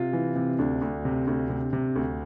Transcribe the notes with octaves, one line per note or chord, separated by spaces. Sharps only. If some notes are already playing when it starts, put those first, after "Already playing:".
Already playing: C3 F4
E3
C3
D2 D4
D2
C3
D2
C3
C3
D2